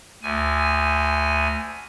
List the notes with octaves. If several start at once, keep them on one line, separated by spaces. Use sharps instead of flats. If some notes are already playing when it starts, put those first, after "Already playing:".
D2 G#5